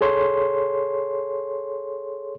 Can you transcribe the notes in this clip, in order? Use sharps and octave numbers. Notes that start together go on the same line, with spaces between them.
G#4 A4 C#5 C6